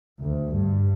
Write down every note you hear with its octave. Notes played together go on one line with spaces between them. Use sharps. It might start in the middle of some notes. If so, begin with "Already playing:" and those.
D2
G2